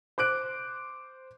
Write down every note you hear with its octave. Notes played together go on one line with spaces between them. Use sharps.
C5 D6 F#6 D7